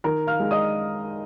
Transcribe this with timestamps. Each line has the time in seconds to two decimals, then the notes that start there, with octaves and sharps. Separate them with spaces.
0.04 D#3 A#4 A#5
0.27 F5 F6
0.40 G#3 D#4
0.51 D#5 D#6